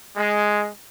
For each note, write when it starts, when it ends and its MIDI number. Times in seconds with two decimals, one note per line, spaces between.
0.16 0.67 56